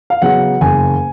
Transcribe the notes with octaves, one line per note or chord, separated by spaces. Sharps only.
F5
C#3 F#3 B3 F#5
F#1 G#5